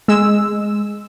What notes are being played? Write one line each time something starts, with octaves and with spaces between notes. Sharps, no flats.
G#3 E6